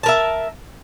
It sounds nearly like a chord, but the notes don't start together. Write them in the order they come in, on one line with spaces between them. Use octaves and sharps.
A5 A#4 E5